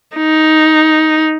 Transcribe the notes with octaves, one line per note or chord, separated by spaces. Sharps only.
D#4